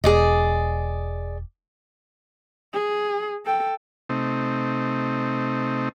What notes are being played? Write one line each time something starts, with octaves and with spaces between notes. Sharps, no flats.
E1 G#4 D5 D#5
G#4
A4 G5
C3 A3 C4 D#4